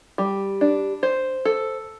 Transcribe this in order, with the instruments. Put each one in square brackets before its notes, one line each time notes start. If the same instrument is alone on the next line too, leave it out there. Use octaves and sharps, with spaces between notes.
[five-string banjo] G3
D4
C5
A4